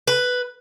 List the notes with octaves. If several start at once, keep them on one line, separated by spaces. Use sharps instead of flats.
B4